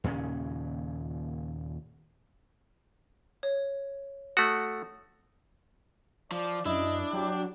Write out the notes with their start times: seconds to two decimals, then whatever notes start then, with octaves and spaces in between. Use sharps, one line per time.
0.04 D#2 A#2 C#3 C#4
3.43 C#5
4.37 A3 F#4 D#6
6.32 F3 D5
6.66 F#2 D4 E4 D#5
7.13 F#3 G4